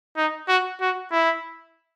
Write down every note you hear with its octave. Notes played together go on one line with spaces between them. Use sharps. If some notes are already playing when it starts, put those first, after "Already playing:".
D#4
F#4
F#4
E4